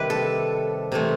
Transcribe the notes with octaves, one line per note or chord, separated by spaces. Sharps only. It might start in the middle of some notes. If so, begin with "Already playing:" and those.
Already playing: C3 D#3 G3 C4 E4 G4 B4
A4
C3 E3 A3 C4